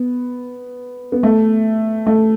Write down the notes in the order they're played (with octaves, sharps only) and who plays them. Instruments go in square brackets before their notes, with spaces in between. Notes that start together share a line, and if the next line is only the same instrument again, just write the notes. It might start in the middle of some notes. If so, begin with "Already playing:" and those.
Already playing: [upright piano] B3
B3
A3
A3